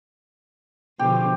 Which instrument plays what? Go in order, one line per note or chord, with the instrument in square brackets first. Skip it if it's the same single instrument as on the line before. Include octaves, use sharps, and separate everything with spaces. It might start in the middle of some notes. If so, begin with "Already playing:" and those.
[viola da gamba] B2 D3 F3 [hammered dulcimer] G4